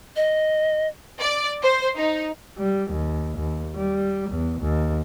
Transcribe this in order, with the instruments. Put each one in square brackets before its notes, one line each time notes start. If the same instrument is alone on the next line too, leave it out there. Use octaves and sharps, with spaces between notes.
[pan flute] D#5
[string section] D5
C5
D#4
[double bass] G3
D#2
D#2
G3
E2
D#2